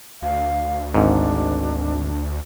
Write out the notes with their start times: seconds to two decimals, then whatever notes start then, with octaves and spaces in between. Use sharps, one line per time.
0.22 D2 F5
0.94 G#1 G#2 D4